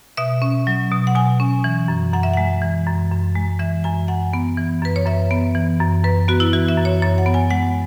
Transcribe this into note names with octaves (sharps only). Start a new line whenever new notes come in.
B2 E5
C#4
F#3
B2
F#5
B2 G#5
C#4
E3
F#2
F#2 F#5
E5
G#3 F#5
E3
F#2
F#2
G#3
E3 E5
F#2 G#5
F#2 F#5
B3
E3
F#2 B4
C#5
F#2 E5
B3
E3
F#2
F#2 B4
B3 F#4
E4
E3 F#4
E5
F#2
C#5
F#2 C#5
F#5
B3
G#5
G#3 F#5